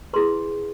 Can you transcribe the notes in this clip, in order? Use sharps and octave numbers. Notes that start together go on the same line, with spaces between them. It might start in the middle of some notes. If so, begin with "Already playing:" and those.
E4 G#4 B4 C6